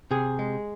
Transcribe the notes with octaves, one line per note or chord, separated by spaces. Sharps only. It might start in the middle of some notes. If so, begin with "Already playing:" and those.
C3 G#4
G#3